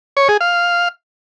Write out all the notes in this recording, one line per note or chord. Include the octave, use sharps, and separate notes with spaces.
C#5
G#4
F5